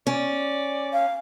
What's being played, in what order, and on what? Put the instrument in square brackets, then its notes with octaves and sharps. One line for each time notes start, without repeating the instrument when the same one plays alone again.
[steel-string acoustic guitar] C#4 [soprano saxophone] D5
[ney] F5